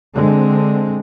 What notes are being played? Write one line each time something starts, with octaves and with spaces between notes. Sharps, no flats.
D3 G#3 C4